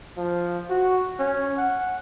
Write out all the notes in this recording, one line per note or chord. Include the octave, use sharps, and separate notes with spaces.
F3
F#4
C#4
F#5